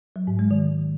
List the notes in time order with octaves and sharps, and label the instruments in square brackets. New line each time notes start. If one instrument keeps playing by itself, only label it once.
[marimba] F#3
G#2
G#3
D#3